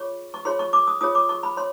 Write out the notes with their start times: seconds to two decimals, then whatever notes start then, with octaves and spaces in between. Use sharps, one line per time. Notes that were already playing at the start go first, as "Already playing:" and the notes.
Already playing: F4 G#4 C#5 C#6
0.34 C#6
0.45 F4 G#4 C#5 C6
0.59 C#6
0.73 D6
0.87 D#6
1.01 F4 G#4 C#5 D#6
1.15 D6
1.29 C#6
1.43 B5
1.57 C#5 C6